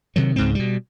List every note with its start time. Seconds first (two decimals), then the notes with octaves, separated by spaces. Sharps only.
0.16 C3 D#3 F#3
0.36 C#2 G#2 C4
0.55 B2 G3